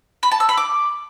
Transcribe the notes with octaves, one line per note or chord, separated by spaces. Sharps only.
B5
A5
E6
B5
D6